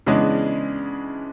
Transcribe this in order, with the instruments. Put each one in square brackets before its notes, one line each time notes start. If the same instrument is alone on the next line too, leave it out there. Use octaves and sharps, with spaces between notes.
[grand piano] C#3 E3 G#3 B3 D4